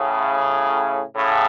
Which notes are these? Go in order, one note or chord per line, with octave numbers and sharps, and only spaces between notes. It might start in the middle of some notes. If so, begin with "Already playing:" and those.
Already playing: A2 C#3
A2 C#3